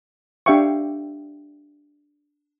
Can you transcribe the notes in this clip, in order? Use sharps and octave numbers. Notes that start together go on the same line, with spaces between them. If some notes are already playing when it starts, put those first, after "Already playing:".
D4 G4 E5 F5 G5 C#6